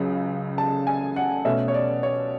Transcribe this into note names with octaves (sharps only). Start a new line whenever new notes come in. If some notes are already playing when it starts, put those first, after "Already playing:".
Already playing: C#2 C#3 F#3
A5
G#5
F#5
B2 A3 C#4 E5
C#5
D5
C#5